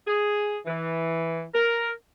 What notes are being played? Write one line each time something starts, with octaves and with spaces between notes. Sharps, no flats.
G#4
E3
A#4